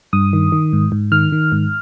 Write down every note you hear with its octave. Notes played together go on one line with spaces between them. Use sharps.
G2 D#6
D#3
D#3
G#2
G#2
D#3 F6
D#3
G#2